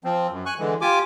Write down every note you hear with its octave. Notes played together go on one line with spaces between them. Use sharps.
F3 C4
F#2
G#5 C#6 F#6
D3 E3 G#3
F4 G4 G#5 D6